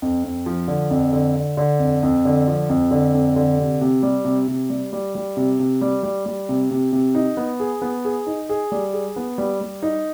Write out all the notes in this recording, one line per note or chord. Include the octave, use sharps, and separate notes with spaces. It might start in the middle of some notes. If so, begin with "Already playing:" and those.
F2
F2
F3
D3
F2
D3
D3
D3
F2
F2
D3
F3
F2
D3
F2
D3
C3
C3
G3
C3
C3
G3
G3
G3
C3
C3
G3
G3
G3
C3
C3
C3
D#4
B3
G#4
B3
G#4
D#4
G#4
G3
G#4
B3
G3
G3
D#4